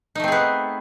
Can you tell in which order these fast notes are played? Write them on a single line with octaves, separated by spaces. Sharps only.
D#4 A3 C4 G#4 B3